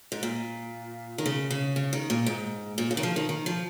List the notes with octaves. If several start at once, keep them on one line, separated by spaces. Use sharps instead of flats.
G#2
A#2
D#3
C#3
C#3
C#3
D#3
A#2
G#2
A#2
C#3
D#3
F3
D#3
D#3
F3